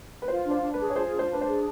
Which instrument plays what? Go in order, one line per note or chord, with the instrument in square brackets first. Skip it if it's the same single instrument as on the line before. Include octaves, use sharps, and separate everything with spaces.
[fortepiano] B4
[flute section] F4 [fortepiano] C5
[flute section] D4
[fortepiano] C5
[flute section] D4
[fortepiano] B4
[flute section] G#4
[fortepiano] C#5
[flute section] F4 [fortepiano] C5
[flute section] D4
[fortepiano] C5
[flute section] D4 [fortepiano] B4
[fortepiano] C5
[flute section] G#4